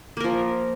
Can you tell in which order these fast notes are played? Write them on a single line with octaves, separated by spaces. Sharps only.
A#3 A#4 F3